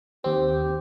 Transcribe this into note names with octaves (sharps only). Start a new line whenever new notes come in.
D#2 C4 G4